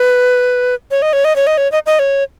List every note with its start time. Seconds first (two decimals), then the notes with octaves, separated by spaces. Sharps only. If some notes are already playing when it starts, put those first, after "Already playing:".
Already playing: B4
0.91 C#5
1.02 D#5
1.13 C#5
1.25 D#5
1.36 C#5
1.47 D#5
1.58 C#5
1.72 D#5
1.86 D#5
1.99 C#5